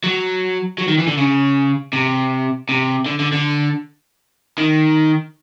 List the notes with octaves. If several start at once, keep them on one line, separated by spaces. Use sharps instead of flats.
F#3
F#3
D#3
E3
D3
C#3
C3
C3
D3
D3
D3
D#3